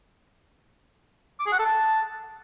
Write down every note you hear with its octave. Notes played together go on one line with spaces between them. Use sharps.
D6
G#4
F#5
A4
A5